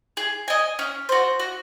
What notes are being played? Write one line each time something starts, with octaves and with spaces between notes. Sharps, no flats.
G#4
D#5 G#5
C#4
F#4 C5
F#4